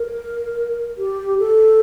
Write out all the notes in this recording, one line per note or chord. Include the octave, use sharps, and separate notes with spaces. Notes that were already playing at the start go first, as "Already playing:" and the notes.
Already playing: A#4
G4
A4